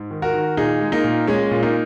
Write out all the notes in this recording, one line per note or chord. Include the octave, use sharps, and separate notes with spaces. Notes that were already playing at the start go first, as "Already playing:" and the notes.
Already playing: G#2
D#3
F#4 A#4
D#3
A#2 D#4 G#4
G#3
A#3 D#4
A#2
A#2 G#3 C#4
A#2
A#3 D#4